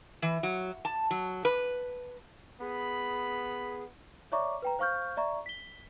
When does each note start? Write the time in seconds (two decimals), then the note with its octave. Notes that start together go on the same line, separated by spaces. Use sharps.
0.22 E3
0.43 F#3
0.85 A5
1.11 F#3
1.45 B4
2.61 B3 G#4 B5
4.32 C#5 D5 E5 A#5 C#6 D6
4.62 B4 G5 A#5
4.79 C5 F5 C#6 F6 G6
5.17 D5 E5 A#5 C#6
5.46 B6 G7